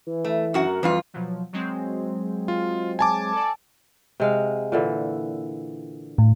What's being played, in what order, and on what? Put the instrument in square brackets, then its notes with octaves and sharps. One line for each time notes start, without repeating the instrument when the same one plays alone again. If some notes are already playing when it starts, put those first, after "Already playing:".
[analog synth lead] E3
[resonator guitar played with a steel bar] A3
F#2 F#4 F#5
[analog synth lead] A#4
[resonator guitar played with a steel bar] F2 G3 F4 [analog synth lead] E3
[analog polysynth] B2 F3 F#3
F#3 G#3 C4
[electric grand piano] F4
G#5 A5 D6
[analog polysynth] A4 D5
[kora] C3 G#3 F5
A#2 D3 E3
[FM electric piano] A2